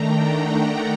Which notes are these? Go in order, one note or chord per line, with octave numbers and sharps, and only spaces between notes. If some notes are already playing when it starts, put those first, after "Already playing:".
Already playing: D#3 A3 D4 G5 A#5
F#5